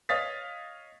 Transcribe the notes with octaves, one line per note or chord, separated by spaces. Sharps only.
C#5 D#5 F5 D#6 A6 B6